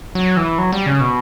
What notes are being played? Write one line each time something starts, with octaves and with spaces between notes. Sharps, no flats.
F#3
E3
F#3
G3
C#3
B2